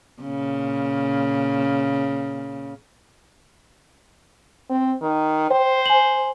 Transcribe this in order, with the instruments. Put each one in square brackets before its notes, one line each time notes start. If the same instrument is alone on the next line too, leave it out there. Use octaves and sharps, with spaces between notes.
[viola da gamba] A#2 C#3
[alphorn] C4
D#3
[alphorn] C5 [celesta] G5
[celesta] G#5 F#7